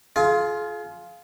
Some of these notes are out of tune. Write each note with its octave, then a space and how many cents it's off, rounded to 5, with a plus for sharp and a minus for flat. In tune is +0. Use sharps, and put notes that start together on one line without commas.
F4 +0 G#4 +40 F5 +0